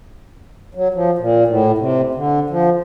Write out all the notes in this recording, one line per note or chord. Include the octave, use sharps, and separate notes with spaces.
F#3
F3
A#2
A2
C3
D3
F3